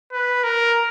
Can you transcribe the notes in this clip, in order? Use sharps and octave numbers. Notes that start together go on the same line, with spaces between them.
B4
A#4